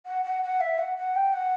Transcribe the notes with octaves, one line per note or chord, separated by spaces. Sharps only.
F#5
F#5
F#5
E5
F#5
F#5
G5
F#5